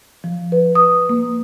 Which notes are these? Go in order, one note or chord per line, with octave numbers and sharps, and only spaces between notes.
F3
B4
D#6
A#3